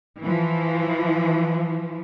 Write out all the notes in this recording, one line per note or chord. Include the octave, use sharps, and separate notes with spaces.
E3 F3